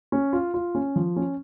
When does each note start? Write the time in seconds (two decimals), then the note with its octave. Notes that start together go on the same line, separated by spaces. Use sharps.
0.12 C#4
0.33 F4
0.54 F4
0.75 C#4
0.96 F3
1.16 C#4